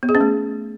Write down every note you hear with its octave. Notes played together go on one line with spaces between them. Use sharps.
B3
G#4
C#4
A3